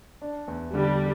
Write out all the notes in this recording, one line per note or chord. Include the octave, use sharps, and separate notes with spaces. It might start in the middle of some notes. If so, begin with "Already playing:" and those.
D4
E2
D3 G3